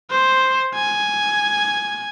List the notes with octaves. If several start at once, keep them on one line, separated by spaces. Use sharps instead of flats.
C5
G#5